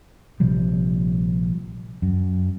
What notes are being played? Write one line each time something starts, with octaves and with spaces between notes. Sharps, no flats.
A#1 C3 F3 G3
F#2